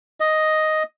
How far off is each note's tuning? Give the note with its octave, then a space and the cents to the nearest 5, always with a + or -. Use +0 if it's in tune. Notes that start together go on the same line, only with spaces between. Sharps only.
D#5 +5